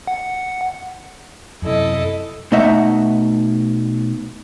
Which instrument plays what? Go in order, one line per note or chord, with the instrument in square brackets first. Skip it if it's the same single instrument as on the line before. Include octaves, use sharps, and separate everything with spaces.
[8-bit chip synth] F#5
[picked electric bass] F#2 C3 [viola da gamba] E4 A4 D#5
[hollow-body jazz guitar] B2 A3 D#4 D#5 E5 F#5